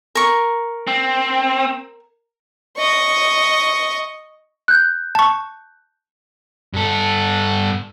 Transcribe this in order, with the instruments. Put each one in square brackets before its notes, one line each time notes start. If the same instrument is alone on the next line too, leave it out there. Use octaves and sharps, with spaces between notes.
[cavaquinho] A#4 C#6
[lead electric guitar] C4
[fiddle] D#5 C#6
[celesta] F#6 G6
[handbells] A5 C#6
[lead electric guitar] G2 A4